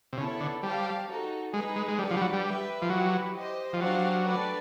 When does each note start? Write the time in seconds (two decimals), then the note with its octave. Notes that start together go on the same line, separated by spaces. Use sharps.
0.13 C3
0.17 C#3 B3 E4 A4 C#5
0.40 D3
0.62 G3 G4 C5 F5 A5
1.08 D#4 F#4 A4
1.53 G#3 D#4 G#4 B4
1.76 G#3
1.88 G#3
1.99 G3 D4 G4 B4 D5 F#5
2.11 F3
2.17 G3
2.21 F#3
2.33 G3
2.44 G4 B4 E5 G5
2.82 F3
2.90 F#3 E4 G4 B4
3.35 G4 C5 D#5
3.73 F3
3.80 F#3 D4 G4 C5 F5
4.26 A3 D4 G4 B4 D5